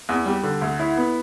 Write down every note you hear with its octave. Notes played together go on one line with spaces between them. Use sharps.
E2
G3
D3
D2
E4
B3